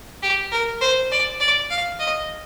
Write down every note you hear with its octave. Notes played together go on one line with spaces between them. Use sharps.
G4
A#4
C5
D5
D5
F5
D#5